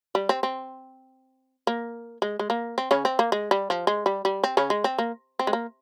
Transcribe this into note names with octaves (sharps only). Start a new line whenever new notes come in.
G3
C4
C4
A#3
G#3
G#3
A#3
C4
C#3 C#4
C4
A#3
G#3
G3
F3
G#3
G3
G3
C4
C#3 C#4
G#3
C4
A#3
C4
G#3
A#3